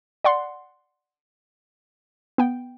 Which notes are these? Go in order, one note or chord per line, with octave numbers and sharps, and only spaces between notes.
D5 F#5 C6
B3 G5